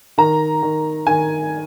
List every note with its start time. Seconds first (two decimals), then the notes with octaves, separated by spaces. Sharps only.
0.18 D#3 A#5
0.62 D#3
1.07 D#3 G#5